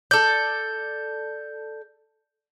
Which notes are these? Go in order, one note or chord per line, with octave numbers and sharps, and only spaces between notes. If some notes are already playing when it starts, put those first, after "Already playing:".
A4 D5 G6